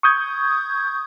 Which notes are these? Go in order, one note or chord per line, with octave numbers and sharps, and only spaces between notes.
C#6 D#6 G6 G#6